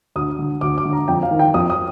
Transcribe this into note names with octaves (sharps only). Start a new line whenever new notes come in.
D2 D#6
D3
D2 D6
D6
D3
A#5
F2 G5
F5
D#3
G5
F2 D#6
D#6